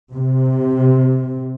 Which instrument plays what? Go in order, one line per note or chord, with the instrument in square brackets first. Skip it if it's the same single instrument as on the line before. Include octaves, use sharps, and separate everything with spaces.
[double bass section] C3